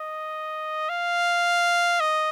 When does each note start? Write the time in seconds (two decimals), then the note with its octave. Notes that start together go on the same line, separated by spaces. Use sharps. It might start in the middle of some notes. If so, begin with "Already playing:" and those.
Already playing: D#5
0.89 F5
2.01 D#5